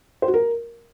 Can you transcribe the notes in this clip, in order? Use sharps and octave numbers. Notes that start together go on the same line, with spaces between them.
C5
F#4
A#4